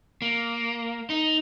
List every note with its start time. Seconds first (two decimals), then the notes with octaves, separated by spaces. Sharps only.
0.22 A#3
1.10 D#4